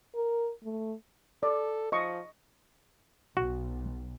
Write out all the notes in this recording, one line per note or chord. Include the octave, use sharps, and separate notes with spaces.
A#4
A3
A4 D5
F3 D#5 C#6
B1 F#4